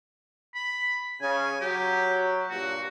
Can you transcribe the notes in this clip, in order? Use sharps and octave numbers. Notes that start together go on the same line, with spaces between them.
B5
C#3 G#5
F#3 G4
G2 A#2 F#4